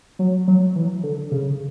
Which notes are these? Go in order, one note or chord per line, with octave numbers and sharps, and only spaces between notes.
F#3
F#3
E3
D3
C#3